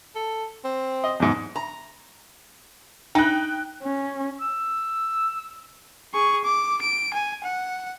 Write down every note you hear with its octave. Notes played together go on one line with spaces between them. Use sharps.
A4
C4
D#5
E2 G#2
A#5
D#4 G5 F#6
C#4
E6
G#4 C#6
D6
D7
G#5
F#5